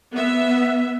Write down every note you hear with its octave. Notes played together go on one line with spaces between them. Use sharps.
B3 E5